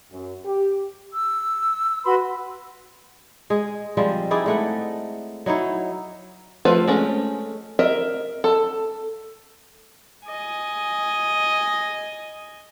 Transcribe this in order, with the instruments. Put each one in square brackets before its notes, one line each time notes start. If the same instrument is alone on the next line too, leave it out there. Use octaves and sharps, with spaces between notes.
[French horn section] F#2
G4
[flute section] E6
F#4 B4 B5 C6
[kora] G#3 G#4
F3 G3 G#3 C4
D#4 E4 G#4 D5
G#3 A3 F#5
F#3 D#4 E4 C#5
[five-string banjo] F3 A3 F4 B4 C5
G#3 A3 C#4
A#4 D#5 E5
A4
[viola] D#5 G#5